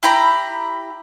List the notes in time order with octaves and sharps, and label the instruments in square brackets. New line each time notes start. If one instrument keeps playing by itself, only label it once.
[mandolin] E4 G4 A#5 B5